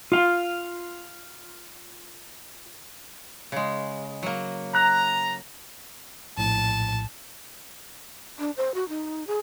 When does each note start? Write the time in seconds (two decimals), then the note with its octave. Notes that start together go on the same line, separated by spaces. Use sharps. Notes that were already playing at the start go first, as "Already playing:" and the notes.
0.12 F4 F5
3.52 C#3 G#3
4.23 F#3 A#3
4.75 A#5 F#6
6.38 A#1 A2 A5
8.39 D4
8.57 C5
8.74 F#4
8.88 D#4
9.27 G#4